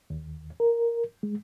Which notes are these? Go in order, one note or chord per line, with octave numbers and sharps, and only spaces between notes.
D#2
A#4
G#3